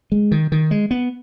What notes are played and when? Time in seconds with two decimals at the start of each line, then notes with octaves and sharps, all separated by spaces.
0.12 G#3
0.31 D#3
0.52 D#3
0.71 G#3
0.91 B3